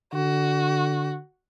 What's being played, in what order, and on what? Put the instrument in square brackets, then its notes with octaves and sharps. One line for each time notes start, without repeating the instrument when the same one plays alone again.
[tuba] D3 [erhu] F#4